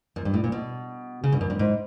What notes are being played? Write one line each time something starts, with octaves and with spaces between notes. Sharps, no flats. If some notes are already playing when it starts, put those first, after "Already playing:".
F#2
G2
A2
A#2
B2
C#3
G2
F#2
G2
G#2